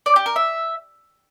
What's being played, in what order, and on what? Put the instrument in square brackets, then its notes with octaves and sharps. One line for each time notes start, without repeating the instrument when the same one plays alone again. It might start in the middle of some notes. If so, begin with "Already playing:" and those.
[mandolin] D5
G4
A#4
E5